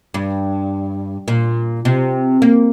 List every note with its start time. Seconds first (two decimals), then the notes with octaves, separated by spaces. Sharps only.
0.14 G2
1.28 A#2
1.85 C3
2.42 A#3